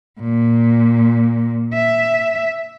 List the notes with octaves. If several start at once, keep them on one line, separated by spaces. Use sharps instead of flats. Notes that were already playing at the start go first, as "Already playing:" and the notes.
A#2
E5